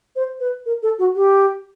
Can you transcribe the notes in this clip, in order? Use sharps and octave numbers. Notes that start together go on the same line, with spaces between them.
C5
B4
A#4
A4
F#4
G4